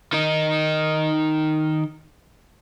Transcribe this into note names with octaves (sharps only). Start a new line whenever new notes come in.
D#3 D#4